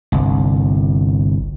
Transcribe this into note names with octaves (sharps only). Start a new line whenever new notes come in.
G1 C2